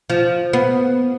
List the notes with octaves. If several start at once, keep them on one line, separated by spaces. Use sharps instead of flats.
F3
B3